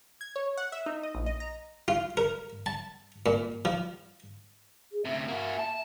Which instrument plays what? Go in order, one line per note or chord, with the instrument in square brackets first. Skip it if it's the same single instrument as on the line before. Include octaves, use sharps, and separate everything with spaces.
[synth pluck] G#6
C#5
F#5
E5
D#4
D#5
A#1
D#5
A#5
[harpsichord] F4
A#4
A5
A#2
F3
[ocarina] G#4
[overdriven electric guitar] D2 C3 [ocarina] E5
[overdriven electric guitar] A#3 F#4
A5